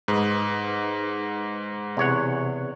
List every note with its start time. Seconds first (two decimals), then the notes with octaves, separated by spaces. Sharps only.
0.08 G#2 D#4 B4 D#6
1.97 E2 C3 C#5 F#5